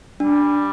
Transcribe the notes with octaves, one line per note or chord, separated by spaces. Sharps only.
G3 D4